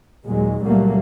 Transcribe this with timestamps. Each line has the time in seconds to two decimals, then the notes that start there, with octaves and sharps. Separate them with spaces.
0.25 D#2 A#2 F#3 G#3
0.62 C#2 A#2 F#3 G3 A3 A#3